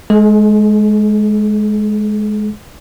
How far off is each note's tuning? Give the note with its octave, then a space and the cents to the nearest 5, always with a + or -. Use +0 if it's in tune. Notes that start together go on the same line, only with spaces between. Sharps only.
G#3 +20 A4 -40